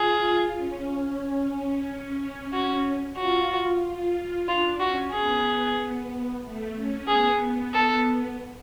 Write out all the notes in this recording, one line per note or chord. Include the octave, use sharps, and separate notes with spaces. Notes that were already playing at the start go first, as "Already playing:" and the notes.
Already playing: F4 G#4
C#4
F#4
F4 F#4
F4
D4 F4
C#4 F#4
B3 G#4
A3
C#4
B3 G#4
A4